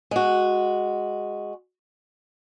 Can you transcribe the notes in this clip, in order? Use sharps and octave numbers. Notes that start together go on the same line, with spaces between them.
G#3 F#4